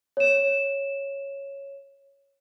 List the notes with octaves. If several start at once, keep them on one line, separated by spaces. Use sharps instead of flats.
C#5 E7